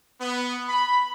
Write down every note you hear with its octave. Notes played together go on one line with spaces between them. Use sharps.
B3
B5